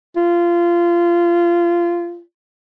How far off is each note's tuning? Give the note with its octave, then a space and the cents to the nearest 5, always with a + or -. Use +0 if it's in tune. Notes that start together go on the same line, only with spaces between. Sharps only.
F4 -20